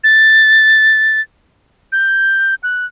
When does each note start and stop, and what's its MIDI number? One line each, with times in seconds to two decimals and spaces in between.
0.04 1.21 93
1.92 2.55 91
2.63 2.86 90